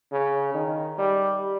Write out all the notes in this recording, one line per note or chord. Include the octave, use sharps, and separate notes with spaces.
C#3
D#3
G3